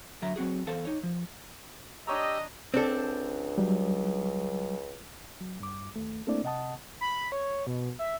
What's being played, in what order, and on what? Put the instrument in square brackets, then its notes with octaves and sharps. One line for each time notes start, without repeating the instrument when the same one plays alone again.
[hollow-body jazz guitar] F#2 D3 F#3 E5 A#5
F#3 C4 F#4 G#4
E2 A4 C5 F5 A5
D#4 C#5
F3
[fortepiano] D4 C#5 A#5 [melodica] G4 E6 [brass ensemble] D#5
[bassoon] C#2 [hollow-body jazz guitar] C4 D4 A4
[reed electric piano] F#3 G3
F#3
G2 D6
D#2 A3
A3 A#3 C4 D4 E4 D5
C3 D#5 F#5 A5 D#6
[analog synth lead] B5
C#5
B2
E5